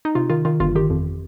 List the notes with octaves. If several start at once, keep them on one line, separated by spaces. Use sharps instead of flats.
D#4
C3 F4
D#3 F4
D#3 F4
G1 F4
D#3 G4
F2